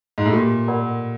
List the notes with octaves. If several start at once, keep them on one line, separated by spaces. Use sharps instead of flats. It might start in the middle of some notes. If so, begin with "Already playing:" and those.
G#2
A2
A#2 G4
A#4 D5 F#5 B5